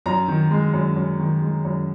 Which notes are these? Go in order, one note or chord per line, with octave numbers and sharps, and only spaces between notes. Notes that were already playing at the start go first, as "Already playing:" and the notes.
F#2 A#5
D#3
G#3
F#2
F#2
D#3
G#3
F#2